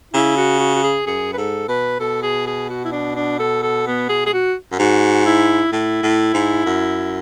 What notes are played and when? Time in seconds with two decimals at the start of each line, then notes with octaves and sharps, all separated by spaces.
0.14 C#3 E4
0.37 F#4
0.59 F#4
0.75 F#4
0.83 G#4
1.07 F#2 G#4
1.33 B4
1.37 G#2 A4
1.68 B2 B4
2.00 B2 A4
2.22 G#4
2.47 G#4
2.70 F#4
2.84 E4
2.92 D4
3.16 D4
3.40 A4
3.63 A4
3.87 B3
4.09 G#4
4.26 G#4
4.33 F#4
4.72 F#2
4.79 G#2 F#4
5.25 E4
5.72 A2 E4
6.03 A2
6.34 G#2
6.66 F#2